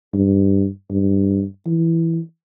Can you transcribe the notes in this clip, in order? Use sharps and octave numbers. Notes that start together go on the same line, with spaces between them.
G2
G2
E3